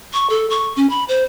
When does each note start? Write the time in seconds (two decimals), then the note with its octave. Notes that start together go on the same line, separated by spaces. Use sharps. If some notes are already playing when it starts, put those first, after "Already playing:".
0.13 C#6
0.30 A4
0.50 C#6
0.76 C#4
0.90 B5
1.08 C5